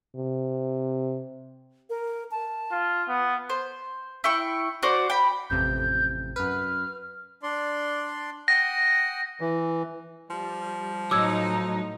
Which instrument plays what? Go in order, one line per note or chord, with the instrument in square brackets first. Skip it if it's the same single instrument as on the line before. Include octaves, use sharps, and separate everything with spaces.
[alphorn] C3
[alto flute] A#4
A5
[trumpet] F4
B3
[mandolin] C5
E4 G5 C#6
F#4 C5 D5
G5 B5
[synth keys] A1 F2 C3 [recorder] G6
[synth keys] F#2 B4 [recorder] F6
[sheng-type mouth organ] D4 D5 C6
[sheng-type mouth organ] F#5 G5 D#6 [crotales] A#6
[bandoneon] E3
[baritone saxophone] F3 [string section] G3
[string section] A2 D#4 [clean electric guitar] F#3 [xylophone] D6 E6 G#6